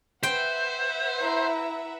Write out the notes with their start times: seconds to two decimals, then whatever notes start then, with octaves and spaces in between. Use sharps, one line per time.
0.23 B4 C5 E5 F#5 G5
1.21 E4 A#5